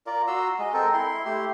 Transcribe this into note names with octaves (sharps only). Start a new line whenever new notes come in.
F4 A#4 D5
F#4 A#5 C6 E6
G#3 D#5
C4 A4 A#4
E4 C6
A3 G4 C6